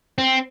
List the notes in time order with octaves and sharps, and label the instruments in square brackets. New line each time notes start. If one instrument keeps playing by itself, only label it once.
[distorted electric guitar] C4